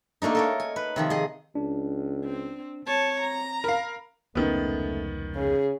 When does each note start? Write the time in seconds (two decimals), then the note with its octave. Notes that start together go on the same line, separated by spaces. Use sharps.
0.22 A3 A#3 D4 D#4
0.35 A4 A#4 C#5
0.60 G#5
0.76 B4
0.96 C3 D#3 F3
1.10 G#4 D#5
1.55 C#2 D4
2.24 C4
2.87 C4 C#5 A5
3.21 A#5
3.64 A#4 F5 B5
4.35 F1 C#2 D#3 A3 B3 C#4
5.35 C#3 G#4